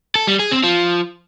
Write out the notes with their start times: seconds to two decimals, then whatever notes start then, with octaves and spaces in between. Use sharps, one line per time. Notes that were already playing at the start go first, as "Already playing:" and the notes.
0.15 A4
0.27 G3
0.39 G#4
0.51 C4
0.63 F3